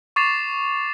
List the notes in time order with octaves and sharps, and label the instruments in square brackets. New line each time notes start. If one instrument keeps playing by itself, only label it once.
[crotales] C#6 D6 A6 C7 E7 F7